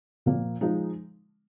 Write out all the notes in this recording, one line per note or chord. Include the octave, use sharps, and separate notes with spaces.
A#2 F3 A#3
F3 G#3 D#4